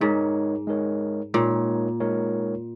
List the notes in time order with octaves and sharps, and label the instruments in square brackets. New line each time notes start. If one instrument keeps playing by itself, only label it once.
[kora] G#2 [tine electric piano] G#3 D#4 A#4 C#5
[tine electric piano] G#3 D#4 A#4 C#5
[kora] A#2 [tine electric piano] G#3 D#4 A#4 C#5
[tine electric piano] G#3 D#4 A#4 C#5